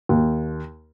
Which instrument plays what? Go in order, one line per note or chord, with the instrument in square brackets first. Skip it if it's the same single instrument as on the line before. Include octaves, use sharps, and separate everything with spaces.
[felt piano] D#2